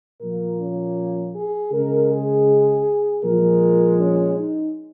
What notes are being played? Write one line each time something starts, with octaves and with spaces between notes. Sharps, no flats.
A#2 F3 A#3 A#4
C#4
G#4
C#3 G#3 A#4
G#4
A#2 F3 G#3 A#4
C#4
D#4